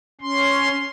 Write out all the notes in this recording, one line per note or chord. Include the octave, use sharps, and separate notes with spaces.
C#4 C6